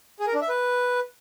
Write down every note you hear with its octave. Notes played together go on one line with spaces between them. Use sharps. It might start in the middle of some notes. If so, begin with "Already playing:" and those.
G#4
A#4
D4
E5
B4